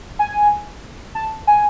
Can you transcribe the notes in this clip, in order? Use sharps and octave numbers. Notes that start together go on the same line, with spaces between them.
G#5
A5
G#5